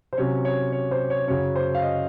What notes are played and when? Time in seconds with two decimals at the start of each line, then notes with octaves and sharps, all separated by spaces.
0.13 C5
0.17 C3 F#3 C#4 C#5
0.45 C#5
0.72 C#5
0.91 C5
1.10 C#5
1.27 F#2 C#3 F#3 C#4 C#5
1.56 C5
1.75 F5
1.82 D#5